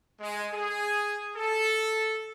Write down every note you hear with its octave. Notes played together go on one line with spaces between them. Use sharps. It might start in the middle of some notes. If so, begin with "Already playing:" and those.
G#3
G#4
A4